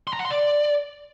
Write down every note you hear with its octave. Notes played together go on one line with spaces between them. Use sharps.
C6
A#5
F#5
C6
D5